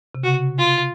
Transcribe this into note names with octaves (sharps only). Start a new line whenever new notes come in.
C3
C#3 F#4
F4